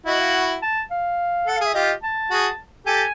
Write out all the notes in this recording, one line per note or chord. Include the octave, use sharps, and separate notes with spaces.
E4 F#4 D#5
F5
F#5
A5
F5
A4 F#5
G#4 F5
E5
F4 G4 D#5
A5
F#4 G#4
G4 A4 G#5